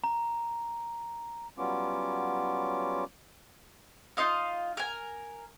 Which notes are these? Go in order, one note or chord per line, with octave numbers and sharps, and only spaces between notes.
A#5
F#3 G3 B3 C#4 F4 D6
D#4 F4 D#5 F5
A#4 G#5